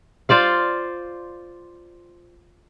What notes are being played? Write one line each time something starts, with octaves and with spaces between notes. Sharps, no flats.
F4 C5 D5 F5